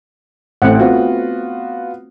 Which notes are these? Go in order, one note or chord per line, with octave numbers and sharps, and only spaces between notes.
A1 A3 C4 F#5
B3 F4 F#4